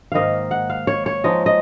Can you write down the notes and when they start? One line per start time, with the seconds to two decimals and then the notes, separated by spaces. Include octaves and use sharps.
0.12 G#2 D#3 A#3 D#4 D#5 F5
0.51 F#5
0.70 F5
0.87 C#5
1.06 C#5
1.24 F3 G#3 D#4 D#5
1.46 D#5